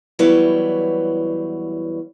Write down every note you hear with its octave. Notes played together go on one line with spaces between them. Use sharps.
E2 F#3 G3 E4 B4 C#5